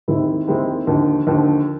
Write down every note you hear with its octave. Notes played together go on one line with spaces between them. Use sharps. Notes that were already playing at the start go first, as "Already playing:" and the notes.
D#2 D#3 G#3 C4 E4
D#2 D#3 G#3 C4 E4
D#2 D3 F3
D#2 D3 F3